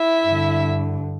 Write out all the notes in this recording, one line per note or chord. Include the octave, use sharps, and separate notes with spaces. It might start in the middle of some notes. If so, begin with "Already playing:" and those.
Already playing: E4 E5
G2 D3